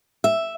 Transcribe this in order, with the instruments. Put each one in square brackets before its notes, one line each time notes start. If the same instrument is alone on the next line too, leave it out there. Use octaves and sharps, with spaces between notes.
[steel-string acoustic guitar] E5